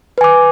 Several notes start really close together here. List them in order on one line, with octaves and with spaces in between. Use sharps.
B4 G#5 D6